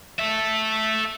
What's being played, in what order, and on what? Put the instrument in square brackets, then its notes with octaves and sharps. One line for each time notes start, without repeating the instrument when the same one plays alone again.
[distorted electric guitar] A4 E5